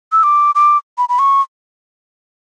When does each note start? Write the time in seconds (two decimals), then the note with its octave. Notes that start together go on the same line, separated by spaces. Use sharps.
0.12 E6
0.23 D6
0.55 D6
0.98 B5
1.09 B5
1.19 C#6